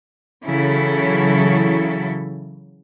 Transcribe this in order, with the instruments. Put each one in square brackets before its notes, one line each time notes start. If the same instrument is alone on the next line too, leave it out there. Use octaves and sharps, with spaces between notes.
[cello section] C#3 E3 F#3 E4 A4